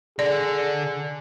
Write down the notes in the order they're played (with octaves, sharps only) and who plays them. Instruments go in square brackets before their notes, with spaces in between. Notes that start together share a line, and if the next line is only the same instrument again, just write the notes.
[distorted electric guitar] D3 [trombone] G#4 [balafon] D5